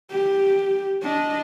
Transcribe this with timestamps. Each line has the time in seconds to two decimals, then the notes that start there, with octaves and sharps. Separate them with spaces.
0.11 G4
1.02 D4 D#5